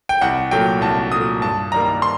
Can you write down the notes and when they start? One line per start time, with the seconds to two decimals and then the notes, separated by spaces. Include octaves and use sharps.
0.09 G5
0.21 C2 F#5
0.51 A#2 F#3 A3 G5
0.81 C2 A5
1.12 A#2 F#3 A3 D#6
1.42 G2 A5
1.72 D#3 G3 A#3 A#5
2.02 C6